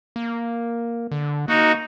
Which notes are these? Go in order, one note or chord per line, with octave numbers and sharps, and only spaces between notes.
A#3
D3
A#3 D#4 F#4